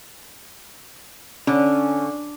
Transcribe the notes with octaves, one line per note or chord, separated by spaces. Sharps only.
D3 C#4